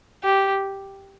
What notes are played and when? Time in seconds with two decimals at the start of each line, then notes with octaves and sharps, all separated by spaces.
0.24 G4